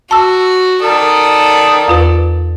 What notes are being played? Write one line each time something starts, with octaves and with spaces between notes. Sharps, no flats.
F#4 A5 E6
A4 A#4 D5 D#6
E2 F4 B4